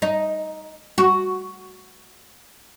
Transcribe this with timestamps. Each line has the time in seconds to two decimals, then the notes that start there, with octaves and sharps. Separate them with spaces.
0.02 D#4
0.98 F#4